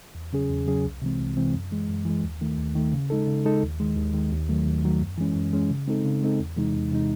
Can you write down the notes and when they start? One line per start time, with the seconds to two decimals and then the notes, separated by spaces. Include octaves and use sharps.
0.15 E2
0.33 C#3 F#3 C#4 G#4
0.50 E2
0.67 C#3 F#3 C#4 G#4
0.85 C2
1.02 C3 E3 G#3 C4
1.20 C2
1.37 C3 E3 G#3 C4
1.54 F#2
1.71 E3 G#3
1.88 F#2
2.05 E3 G#3
2.23 D#2
2.41 D#3 A3
2.58 D#2
2.75 D#3 A3
2.93 C#3
3.10 G#3 D#4 A4
3.27 C#3
3.45 G#3 D#4 A4
3.63 D#2
3.80 D#3 G#3
3.97 D#2
4.14 D#3 G#3
4.32 D#2
4.49 D#3 F#3 A3
4.66 D#2
4.84 D#3 F#3 A3
5.01 F#2
5.18 E3 G#3 C#4
5.35 F#2
5.52 E3 G#3 C#4
5.70 C#3
5.87 G#3 C4 D#4 A4
6.05 C#3
6.23 G#3 C4 D#4 A4
6.40 E2
6.57 C3 E3 G#3 D#4
6.75 E2
6.92 C3 E3 G#3 D#4